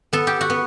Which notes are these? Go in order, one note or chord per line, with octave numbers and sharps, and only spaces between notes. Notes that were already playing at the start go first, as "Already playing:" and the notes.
B3 A4
G4
F#4
B3